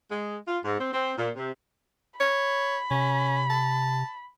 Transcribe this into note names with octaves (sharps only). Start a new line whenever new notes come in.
G#3
F4
G#2
C4
C4
A#2
C3
C#5 B5
C3 C#4
A5